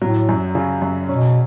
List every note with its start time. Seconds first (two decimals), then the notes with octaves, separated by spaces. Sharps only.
0.02 A2 F#3
0.29 F#2
0.55 C#3
0.82 F#2
1.09 B2 C#4